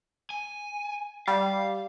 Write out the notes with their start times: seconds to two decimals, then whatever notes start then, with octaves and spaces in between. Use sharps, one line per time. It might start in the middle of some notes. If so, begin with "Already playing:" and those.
0.30 G#5
1.28 G3 F5